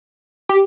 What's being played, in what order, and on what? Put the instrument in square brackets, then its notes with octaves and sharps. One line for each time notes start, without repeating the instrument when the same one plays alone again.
[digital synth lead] G4